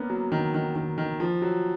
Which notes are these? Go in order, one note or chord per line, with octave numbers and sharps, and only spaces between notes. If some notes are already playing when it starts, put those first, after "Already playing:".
Already playing: A#3 B3 C#4 D4
F#3
D#3
D#3
D#3
D#3
F3
F#3